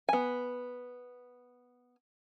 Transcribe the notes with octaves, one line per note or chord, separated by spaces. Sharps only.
B3 G#5